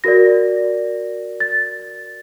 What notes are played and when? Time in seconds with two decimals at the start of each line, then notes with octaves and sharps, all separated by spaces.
0.04 F#4 A#4 D5 A#6
1.40 A6